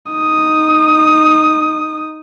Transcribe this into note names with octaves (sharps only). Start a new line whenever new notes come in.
D#4 D#6